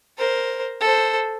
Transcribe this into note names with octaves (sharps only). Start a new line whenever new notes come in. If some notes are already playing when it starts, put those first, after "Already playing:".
A#4 C5
A4 C5